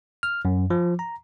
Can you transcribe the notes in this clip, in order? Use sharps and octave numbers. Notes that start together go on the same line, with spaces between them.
F6
F#2
F3
A#5